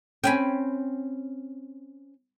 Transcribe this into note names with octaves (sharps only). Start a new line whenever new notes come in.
C4 C#4 G5 G#5 B5